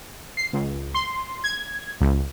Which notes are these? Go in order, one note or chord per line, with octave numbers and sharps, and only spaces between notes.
C7
C#2
C6
G#6
C#2